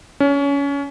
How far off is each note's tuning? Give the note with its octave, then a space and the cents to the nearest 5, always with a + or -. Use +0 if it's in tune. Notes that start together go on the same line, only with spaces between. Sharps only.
C#4 +25